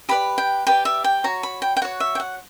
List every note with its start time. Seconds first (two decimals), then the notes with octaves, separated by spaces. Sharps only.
0.09 G4 B4 D5 B5
0.38 G5
0.67 G4 B4 D5 G5
0.85 E5
1.04 G5
1.24 F#4 C#5 A#5
1.43 B5
1.62 G5
1.77 G5
1.82 F#4 C#5 F#5
2.00 E5
2.15 G5
2.20 F#5